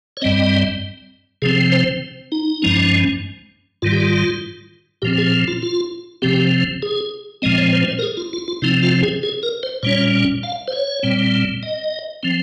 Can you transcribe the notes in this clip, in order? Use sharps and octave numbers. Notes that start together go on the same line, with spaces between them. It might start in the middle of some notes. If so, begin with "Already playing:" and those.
C#5
G2 G3 C4 D#5
C3 F3 C4 G#4
C5
D#4
G2 F3 G#3 C#4
G#2 D#3 G3 F4
G4
F4
A#2 F3 C4 G4
G#4
F4
F4
C3 F3 C4 G4
G#4
A#2 F3 G#3 C4 D#5
C#5
C5
C5
A#4
G#4
F4
F4
F4
C3 F3 C4 D#4
F4
G#4
G#4
A#4
C5
A#2 G3 C#4 C#5
F5
C5
C#5
A#2 G3 C4
D#5
F3 C4